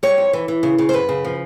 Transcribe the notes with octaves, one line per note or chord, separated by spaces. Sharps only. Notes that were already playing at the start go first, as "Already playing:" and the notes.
G3 C#5
F2
E3
E3
C#3
C#3
C5
F#2 B4
C#3
F3